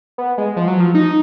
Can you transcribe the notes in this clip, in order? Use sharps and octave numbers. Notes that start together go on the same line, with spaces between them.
B3
G#3
F3
F#3
F3
D#4